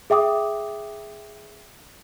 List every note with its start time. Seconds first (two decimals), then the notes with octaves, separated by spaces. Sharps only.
0.10 G#4 E5 G5 D6 D#6